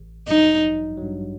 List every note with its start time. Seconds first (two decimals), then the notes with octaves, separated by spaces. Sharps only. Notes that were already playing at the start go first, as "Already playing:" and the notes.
Already playing: A1
0.28 G2 F#3 D#4
0.63 A1
0.97 G2 F#3